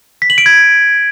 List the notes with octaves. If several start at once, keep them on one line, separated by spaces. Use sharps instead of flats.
B6
F#7
D7
G#6